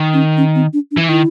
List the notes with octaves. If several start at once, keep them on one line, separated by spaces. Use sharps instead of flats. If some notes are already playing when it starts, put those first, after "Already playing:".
Already playing: D#3
C#4
C#4
C4
D4
D4
E3
D#3 E4